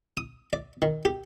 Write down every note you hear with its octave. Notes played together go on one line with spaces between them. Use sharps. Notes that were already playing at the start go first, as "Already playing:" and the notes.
D#6
D5
D#3
G4